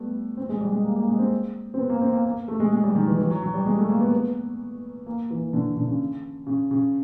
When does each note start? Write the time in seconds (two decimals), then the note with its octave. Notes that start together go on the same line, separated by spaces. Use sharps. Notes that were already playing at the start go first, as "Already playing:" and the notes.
Already playing: G3 A3 B3
0.37 C4
0.49 G#3
0.61 G3
0.72 G#3
0.84 A#3
0.96 A#3
1.08 G#3
1.19 C4
1.74 C4
1.79 B3
1.90 A#3
2.01 C4
2.13 A#3
2.25 A#3
2.48 A3
2.60 G#3
2.72 G#3
2.84 G3
2.95 D#3
3.08 E3
3.18 E3
3.30 F#3
3.42 F#3
3.54 G3
3.66 G#3
3.77 A3
3.89 A#3
4.01 B3
4.13 B3
5.06 A#3
5.30 E3
5.53 D3
5.77 D3
5.88 C#3
6.47 C#3
6.71 C#3